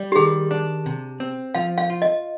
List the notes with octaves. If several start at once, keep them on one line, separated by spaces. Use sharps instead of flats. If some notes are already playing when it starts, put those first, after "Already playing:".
Already playing: G3
G4
D#3 G#4
D4
C3
C4
F3 F5
F5
F4
D#5